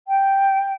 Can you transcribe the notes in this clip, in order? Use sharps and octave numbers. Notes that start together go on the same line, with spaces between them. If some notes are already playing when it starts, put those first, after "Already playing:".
G5